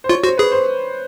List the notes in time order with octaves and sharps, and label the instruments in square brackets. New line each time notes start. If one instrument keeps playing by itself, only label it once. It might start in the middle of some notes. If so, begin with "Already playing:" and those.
[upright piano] C5
[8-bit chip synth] F4 [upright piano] C#5
[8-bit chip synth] F#4 [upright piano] C5
[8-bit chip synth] G#4 [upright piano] B4
[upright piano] C5